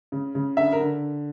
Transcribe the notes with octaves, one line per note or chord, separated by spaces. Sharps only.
C#3
C#3
D3 E5
A#4
D3